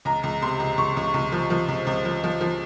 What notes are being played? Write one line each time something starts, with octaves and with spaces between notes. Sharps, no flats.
C#2 A#5
C#2
C3 C6
C#2
C#2 C#6
C#2
C#2
F3
F3
C#2
C#2
F3
F3
F3